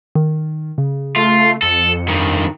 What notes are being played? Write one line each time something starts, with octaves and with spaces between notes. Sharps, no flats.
D#3
C#3
A3 F4
F2 A4 C#7
G2 D#3